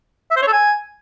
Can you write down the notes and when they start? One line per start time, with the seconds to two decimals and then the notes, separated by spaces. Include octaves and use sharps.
0.31 E5
0.36 C5
0.42 C#5
0.47 A4
0.53 G#5